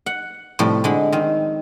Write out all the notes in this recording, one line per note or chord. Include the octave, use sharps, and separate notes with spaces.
F#5
A2 C3 F3 G3
D3 G#3 B5
D#3 C4